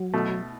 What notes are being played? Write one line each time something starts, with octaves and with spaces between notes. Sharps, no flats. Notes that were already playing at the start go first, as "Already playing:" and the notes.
Already playing: F#3
B2 A3